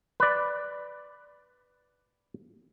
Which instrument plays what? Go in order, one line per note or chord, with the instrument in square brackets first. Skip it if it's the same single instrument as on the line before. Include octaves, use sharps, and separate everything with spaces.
[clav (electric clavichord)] B4 D5